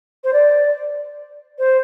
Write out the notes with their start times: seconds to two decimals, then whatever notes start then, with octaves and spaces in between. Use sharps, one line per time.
0.24 C5
0.33 D5
1.59 C5